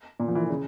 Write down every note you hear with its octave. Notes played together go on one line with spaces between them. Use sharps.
A#2
F3
E3
D3
C#3